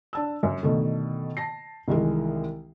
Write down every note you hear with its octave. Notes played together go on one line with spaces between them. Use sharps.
D4 A5 E6
F#2
B2 D3 D#3 A3
A5 A#6 C7
C2 D#3 E3 G#3